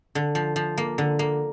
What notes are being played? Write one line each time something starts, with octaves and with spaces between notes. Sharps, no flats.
D3
F3
F3
A#3
D3
A#3